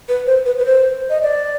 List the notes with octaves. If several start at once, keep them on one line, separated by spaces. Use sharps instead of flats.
B4
C5
B4
B4
C5
D#5
D5